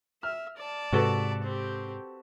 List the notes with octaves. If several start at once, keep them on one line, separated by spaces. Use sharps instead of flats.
E5 F6
D5 A5
G#2 C3 F#4 A4 B4
C4 G4